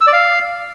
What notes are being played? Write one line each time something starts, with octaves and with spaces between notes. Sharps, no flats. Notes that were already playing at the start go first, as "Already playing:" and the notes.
E6
D5
F5